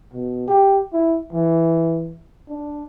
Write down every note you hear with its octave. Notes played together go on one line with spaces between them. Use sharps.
B2
G4
E4
E3
D4